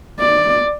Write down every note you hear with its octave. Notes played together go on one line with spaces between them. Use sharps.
D5